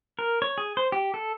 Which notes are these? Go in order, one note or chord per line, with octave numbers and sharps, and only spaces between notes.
A#4
C#5
G#4
C5
G4
A4